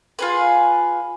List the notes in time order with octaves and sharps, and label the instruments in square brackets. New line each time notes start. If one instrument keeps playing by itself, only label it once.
[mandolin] F4 G#4 B4